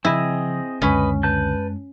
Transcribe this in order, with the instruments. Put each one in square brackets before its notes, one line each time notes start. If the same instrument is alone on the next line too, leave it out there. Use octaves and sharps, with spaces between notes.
[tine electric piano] C#3 F3 [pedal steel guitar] C4 G#4 D#5 [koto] E4
[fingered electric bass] C#2 D3 [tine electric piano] F#2 G#3 [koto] C#4 [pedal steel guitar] B4 D#5
[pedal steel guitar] B4 A5 G6